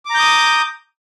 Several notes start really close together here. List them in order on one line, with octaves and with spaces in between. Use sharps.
D6 A#5 G6 D#6